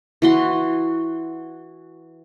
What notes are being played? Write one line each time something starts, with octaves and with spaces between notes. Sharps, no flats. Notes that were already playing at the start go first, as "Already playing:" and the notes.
E3 F#4 C6